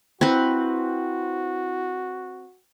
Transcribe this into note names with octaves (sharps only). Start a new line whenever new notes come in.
C4 E4 F#4 B4